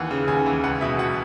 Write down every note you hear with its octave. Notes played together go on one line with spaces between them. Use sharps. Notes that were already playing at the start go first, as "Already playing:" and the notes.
Already playing: D#2 E3 F#5
C#3
D#2 G#5
E3
C#2 F#5
B2 E5
B2 F#5